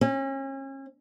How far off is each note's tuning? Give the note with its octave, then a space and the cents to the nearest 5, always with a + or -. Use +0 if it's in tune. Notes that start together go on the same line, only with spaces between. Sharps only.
C#4 -35